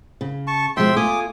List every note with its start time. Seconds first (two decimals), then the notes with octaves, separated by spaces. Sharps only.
0.21 C#3
0.47 A5 C#6
0.77 B2 F3 G#3 E5 G5 C6
0.96 A3 F4 G#5 D6 D#6